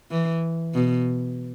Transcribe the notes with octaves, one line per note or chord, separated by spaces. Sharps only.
E3
B2